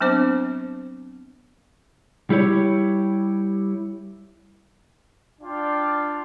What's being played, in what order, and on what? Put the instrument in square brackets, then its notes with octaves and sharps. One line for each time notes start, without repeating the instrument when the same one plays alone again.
[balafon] F#3 B3 C4 D4 C5 D6
[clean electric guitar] G3 E4 G4 C#5
[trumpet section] D4 F4 D5 F5 G5